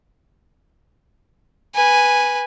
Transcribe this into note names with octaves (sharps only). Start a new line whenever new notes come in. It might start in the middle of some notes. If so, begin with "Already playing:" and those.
B4 G#5